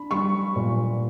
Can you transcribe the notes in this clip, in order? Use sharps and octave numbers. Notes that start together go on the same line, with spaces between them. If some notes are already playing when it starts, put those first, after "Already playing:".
Already playing: D4 B5
G3 C#6
A#2